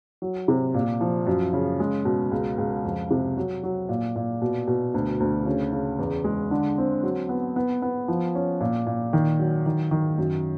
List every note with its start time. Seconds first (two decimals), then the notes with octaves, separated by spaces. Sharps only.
0.22 F#3
0.48 C3
0.74 A#2
1.01 F3
1.27 F#2
1.53 C#3
1.80 G#3
2.05 B2
2.31 C#2
2.58 C#2
2.85 F2
3.11 C3
3.37 F#3
3.63 F#3
3.89 A#2
4.16 A#2
4.42 B2
4.67 B2
4.94 D2
5.20 D2
5.46 C#3
5.72 C#3
5.99 E2
6.24 G#3
6.51 D3
6.78 C4
7.03 F#3
7.29 B3
7.56 B3
7.82 B3
8.08 F3
8.35 C#4
8.61 A#2
8.87 A#2
9.13 D#3
9.39 F#3
9.66 D#3
9.91 D#3
10.18 F#2